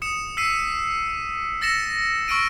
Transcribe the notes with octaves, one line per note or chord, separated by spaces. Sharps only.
D#6 C#7 E7
E6 B6 C7 D#7
E6 A6 A#6 C#7 E7
C#6 E6 F6 D7 D#7